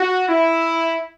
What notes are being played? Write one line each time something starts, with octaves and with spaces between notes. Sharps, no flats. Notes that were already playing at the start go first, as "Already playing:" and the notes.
Already playing: F#4
E4